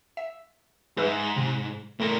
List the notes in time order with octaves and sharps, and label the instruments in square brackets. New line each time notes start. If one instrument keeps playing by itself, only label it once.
[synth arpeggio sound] E5
[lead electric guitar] G#2 [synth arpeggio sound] G#3 B4 E5
[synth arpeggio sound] C3
[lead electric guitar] A2 A#4 [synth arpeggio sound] A3